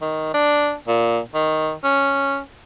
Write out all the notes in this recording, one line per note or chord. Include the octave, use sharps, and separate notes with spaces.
D#3
D4
A#2
D#3
C#4